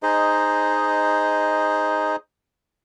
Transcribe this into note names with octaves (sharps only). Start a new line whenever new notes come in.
D#4 G#4 C5 D#5